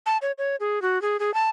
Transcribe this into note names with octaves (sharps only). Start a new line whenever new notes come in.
A5
C#5
C#5
G#4
F#4
G#4
G#4
A5